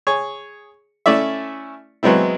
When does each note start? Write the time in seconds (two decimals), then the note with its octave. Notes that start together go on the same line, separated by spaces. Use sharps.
0.07 G#4 C#5
1.06 A3 C#4 E4 D5 E5
2.03 E3 F#3 G#3 B3 C4 E4